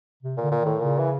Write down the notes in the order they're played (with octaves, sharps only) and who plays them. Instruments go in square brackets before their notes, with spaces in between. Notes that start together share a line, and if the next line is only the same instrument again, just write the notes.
[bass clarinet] C3
[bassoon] A#2 [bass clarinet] D3
[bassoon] A#2
[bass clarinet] D#3
[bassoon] A2
[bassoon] A#2 [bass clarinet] C#3
[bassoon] E3